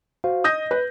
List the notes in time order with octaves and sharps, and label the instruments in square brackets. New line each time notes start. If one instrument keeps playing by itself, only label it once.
[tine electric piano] F#4 C5 F5
[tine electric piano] D#5 [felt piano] D#6 G6 A#6
[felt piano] B4